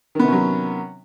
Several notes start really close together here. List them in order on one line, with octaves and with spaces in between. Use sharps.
D#3 B3 C3 C#4 F#3